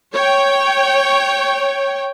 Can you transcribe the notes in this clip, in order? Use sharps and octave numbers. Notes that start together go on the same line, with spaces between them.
C#5 G5